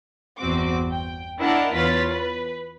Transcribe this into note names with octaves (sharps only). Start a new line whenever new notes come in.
G1 E2 C4 F#4 D6
G5
D4 E4 A#4 D#5 F#5 A5
E2 F4 B4 C#5 A6 B6
B4